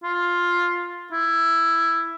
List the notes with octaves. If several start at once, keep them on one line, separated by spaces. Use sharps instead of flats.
F4
E4